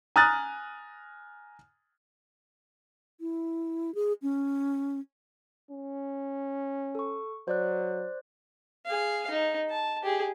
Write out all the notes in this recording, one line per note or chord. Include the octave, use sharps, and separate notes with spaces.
G#5 A#5 D#6 F6 F#6 A6
E4
G#4
C#4
C#4
A4 C#6
F#3 C5 D5 F#6
G#4 F5
D#4
A5
G4 G#4